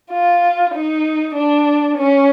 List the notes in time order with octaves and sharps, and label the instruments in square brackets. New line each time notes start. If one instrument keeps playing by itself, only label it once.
[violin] F4
D#4
D4
C#4